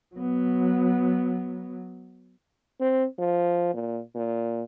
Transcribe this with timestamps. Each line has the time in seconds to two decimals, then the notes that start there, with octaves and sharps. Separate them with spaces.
0.15 F#3 B3
2.81 C4
3.19 F3
3.74 A#2
4.15 A#2